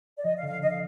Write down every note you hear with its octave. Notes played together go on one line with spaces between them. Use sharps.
D5
F3 D#5
F5
D3
F5
D3 D#5
F5